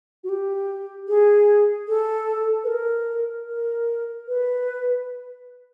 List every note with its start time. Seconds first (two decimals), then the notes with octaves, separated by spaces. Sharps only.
0.24 F#4
0.29 G4
1.08 G#4
1.88 A4
2.64 B4
2.68 A#4
3.47 A#4
4.28 B4